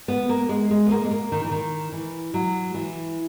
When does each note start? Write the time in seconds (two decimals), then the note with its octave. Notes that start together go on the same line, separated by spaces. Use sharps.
0.08 B3
0.29 A#3
0.49 G#3
0.71 G#3
0.86 B3
0.91 A#3
1.04 G#3
1.11 A#3
1.32 D#3
1.45 E3
1.51 D#3
1.92 E3
2.34 F#3
2.74 E3